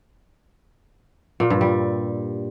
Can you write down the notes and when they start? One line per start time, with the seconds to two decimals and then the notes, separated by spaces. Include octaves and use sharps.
1.40 A#2
1.50 G2
1.61 G3